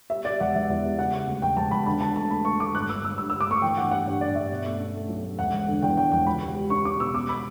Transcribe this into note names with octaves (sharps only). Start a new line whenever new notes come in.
G3 E5
G3 D5
E1 F#5
E1 E5
E2
G3
C#3 F#5
C#3
D2
E1 G5
E1 A5
E1 B5
D3 B5
D3 A5
A3 A5
A3 B5
A3 C#6
A3 D6
G1 F#6
G1 E6
G1 E6
G2 E6
G2 E6
D6
A3 C#6
E3 G5
G2 F#5
G3 F#5
G2
G2 D5
G2 E5
B2
A3
C#4
A3
B1
A3
E1 F#5
E1
D3
E2 G5
E1 G5
E1 G5
C#2 B5
G3
G3
C#4 C#6
C#4 D6
B2 E6
G3 D6
B5